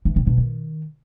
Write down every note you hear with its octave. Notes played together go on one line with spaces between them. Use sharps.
E3
C3
B2
D#3